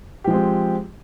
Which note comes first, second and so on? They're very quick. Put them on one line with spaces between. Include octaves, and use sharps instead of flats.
G4 F3 G#3 C4